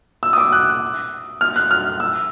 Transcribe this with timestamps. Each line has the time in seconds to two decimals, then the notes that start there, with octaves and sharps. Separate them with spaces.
0.23 E6
0.33 D#6
0.38 D6
0.52 F#6
1.41 F6
1.56 F#6
1.71 F6
2.00 E6